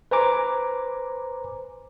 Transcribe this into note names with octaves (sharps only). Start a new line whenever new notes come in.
B4 C5 G#5 A#5 D6